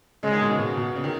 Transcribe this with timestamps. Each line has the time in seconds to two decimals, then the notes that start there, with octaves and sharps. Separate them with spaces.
0.23 C#3 G#3
0.33 D#3
0.41 B2
0.50 C#3
0.59 B2
0.77 B2
0.96 C#3
1.04 D#3